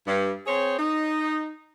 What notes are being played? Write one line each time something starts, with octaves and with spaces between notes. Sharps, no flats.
G2
C4 G#4 C5 C#5
D#4